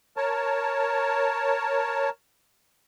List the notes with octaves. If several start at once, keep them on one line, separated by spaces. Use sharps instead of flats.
A#4 C#5 A5